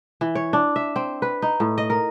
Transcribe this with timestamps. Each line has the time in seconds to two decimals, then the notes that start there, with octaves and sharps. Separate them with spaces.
0.21 E3
0.35 C#5
0.53 D4
0.76 E5
0.96 C4
1.22 B4
1.42 D#4
1.60 A2
1.78 D#5
1.90 A#4